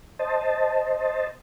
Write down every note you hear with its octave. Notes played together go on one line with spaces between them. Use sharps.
C5 D#5 A5